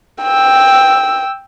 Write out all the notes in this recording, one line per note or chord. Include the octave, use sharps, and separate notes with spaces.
G5 E6